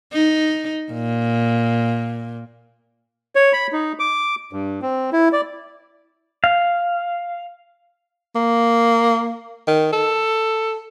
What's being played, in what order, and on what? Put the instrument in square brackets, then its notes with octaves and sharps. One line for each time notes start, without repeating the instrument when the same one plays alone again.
[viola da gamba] D#4
A#2
[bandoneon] C#5
B5
D#4
D6
G2
C4
E4
D5
[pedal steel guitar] F5
[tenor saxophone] A#3
D#3
A4